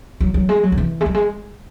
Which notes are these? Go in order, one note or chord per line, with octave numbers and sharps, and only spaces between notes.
F#3
F#3
G#3
F#3
D3
E3
G#3
F#3
G#3